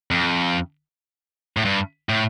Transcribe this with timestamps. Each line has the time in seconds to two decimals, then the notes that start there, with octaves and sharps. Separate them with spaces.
0.11 F2
1.57 A2
1.65 G2
2.09 A2